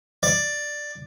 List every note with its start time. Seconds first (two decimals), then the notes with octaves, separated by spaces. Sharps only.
0.23 D5